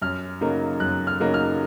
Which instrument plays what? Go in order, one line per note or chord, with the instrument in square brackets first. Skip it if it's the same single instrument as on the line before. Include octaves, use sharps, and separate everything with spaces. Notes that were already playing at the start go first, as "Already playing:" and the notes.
[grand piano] F#2 F6
C#3 F#3 A#3 D#4
F#2 F#6
F6
C#3 F#3 A#3 D#4
F6